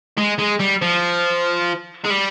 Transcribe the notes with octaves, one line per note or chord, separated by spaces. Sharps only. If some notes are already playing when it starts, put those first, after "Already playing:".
G#3
G#3
G3
F3
G#3
G3